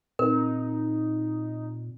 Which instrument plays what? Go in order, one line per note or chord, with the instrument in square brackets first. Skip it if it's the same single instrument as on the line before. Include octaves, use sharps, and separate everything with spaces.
[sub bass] A#2 [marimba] C4 [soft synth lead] D#4 [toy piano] A#4